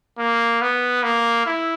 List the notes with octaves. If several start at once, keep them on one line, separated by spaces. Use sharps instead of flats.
A#3
B3
A#3
E4